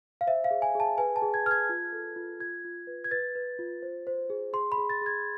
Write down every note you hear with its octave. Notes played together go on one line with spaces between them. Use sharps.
F5
C5 E5
F5
G#4
G#5
G#4 A5
B4 G#5
A5
G#4
G#6
B4 F6
G#6
F4
A4
F4
F4 G#6
F4
B4
G#6
B4 A6
B4
F4
C5
C5
G#4
G#4 C6
B5
G#4
A6
G#4 G#6